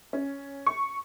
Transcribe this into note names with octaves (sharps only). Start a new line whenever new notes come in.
C#4
C#6